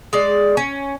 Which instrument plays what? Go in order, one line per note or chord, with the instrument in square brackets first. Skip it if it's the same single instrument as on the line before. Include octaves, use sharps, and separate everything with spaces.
[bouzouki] G#3 D5
C#4